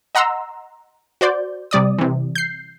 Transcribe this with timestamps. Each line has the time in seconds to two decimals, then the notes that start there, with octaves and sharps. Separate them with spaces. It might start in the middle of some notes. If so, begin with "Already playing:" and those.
0.15 D#5 F#5 A#5 C6 E6
1.21 F#4 C5 D5 G6
1.71 C3 G3 D5 D#6
1.98 C3 E3
2.35 G6 C7